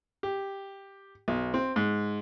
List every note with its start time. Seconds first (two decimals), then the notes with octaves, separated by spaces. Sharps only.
0.23 G4
1.28 B1
1.54 C4
1.76 G#2